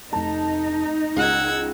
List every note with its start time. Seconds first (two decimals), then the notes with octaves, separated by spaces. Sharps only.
0.13 F1 D#4 A5
1.16 C#2 F#5 E6 G#6